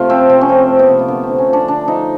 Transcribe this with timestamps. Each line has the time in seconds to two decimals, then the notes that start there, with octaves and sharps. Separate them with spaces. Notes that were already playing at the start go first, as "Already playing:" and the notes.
Already playing: C3 A3 F4
0.10 F3 C4
0.29 C3 C4
0.41 C#4
0.49 F3 C4
0.69 A3
0.79 B3
0.89 C3
0.99 A#3
1.08 D3 B3
1.23 C4
1.29 D3
1.38 C#4
1.49 F3 D4
1.68 D3 D4
1.88 F3 D#4